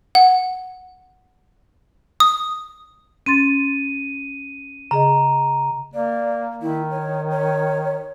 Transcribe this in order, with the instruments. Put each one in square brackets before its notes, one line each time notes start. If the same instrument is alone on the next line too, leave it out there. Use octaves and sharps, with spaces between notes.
[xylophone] F#5
D#6
[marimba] C#4 C6 A6 [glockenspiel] D#7
[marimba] C#3 G#4 D#5 [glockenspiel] A#5
[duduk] A#3 [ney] D5
[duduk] D#3 [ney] E4
[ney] C#5
C#5